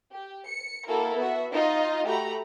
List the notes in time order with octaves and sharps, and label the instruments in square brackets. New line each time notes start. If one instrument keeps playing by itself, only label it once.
[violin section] G4
C#7
A#3 E4 F#4 A4 A#4
B3 F#4 E5
D#4 F4 D#5
A3 F#4 G4 A#5 B5